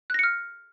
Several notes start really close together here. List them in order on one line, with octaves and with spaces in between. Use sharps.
F#6 A#6 C#7 F6